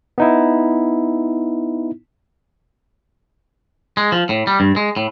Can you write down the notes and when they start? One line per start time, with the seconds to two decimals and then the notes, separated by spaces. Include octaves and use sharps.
0.18 B3 D#4 E4
3.97 G#3
4.12 F3
4.29 A2
4.47 G3
4.60 G2
4.76 G#3
4.97 A2